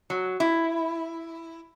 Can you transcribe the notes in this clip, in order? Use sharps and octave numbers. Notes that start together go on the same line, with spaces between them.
F#3
E4